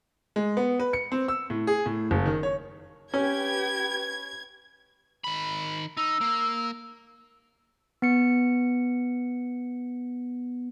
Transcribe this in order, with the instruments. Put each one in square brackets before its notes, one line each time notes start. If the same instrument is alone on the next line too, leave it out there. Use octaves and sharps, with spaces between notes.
[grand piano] G#3
B3
B4
C#7
C4
E6
A2
G#4
A2
F#1
D#3
C#5
[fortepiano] C#4 [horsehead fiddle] G4 G5 [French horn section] B4 [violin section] G#6
[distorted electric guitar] D#3 B5
[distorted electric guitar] D#4 [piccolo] E6
[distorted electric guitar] A#3
[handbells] B3 C#7